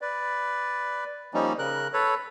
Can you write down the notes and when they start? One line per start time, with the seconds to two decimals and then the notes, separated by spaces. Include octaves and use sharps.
0.01 B4 D5
1.34 F3 G3 A#3 C#4 D#4
1.59 C#3 A#4 F#6
1.93 A4 B4 C#5